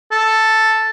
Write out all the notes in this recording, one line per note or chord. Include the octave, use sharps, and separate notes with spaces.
A4